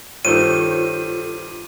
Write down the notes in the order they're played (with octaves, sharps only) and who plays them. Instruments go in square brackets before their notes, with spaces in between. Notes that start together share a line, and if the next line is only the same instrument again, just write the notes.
[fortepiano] G2 D#3 [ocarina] F4 [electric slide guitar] A4 C5 C#5 [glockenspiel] D#7